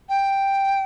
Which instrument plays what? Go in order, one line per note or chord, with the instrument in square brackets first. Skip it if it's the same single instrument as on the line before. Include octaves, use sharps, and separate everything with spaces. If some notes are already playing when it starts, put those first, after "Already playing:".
[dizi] G5